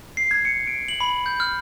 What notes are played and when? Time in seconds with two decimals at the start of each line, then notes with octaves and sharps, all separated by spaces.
0.17 C7
0.31 G#6
0.45 C#7
0.67 D7
0.88 F#7
1.01 B5
1.26 G6
1.40 F6